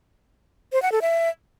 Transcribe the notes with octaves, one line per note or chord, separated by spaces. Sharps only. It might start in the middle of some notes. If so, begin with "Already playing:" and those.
C5
F#5
A4
E5